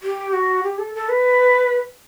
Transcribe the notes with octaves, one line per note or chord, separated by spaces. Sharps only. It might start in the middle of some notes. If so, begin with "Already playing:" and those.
G4
F#4
G4
A4
A4
B4